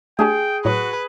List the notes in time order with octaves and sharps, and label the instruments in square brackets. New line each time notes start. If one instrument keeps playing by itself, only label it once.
[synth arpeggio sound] A3 D4 G4 [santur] G#4 [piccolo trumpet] G5
[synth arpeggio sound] A2 F#3 C#6 [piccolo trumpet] F#4 [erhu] B4